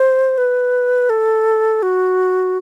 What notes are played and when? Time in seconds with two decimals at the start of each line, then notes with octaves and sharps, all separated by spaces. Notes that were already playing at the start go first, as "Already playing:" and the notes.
Already playing: C5
0.38 B4
1.10 A4
1.83 F#4